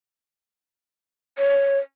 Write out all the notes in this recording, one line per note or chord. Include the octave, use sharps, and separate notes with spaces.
C#5